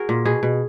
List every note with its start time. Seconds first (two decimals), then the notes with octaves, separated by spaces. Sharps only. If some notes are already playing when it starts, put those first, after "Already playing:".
Already playing: F#4 G#4 A#4
0.09 A#2
0.25 B2 G#4
0.43 B2